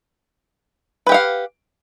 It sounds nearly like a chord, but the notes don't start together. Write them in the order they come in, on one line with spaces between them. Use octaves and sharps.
B4 G4 F#5 F5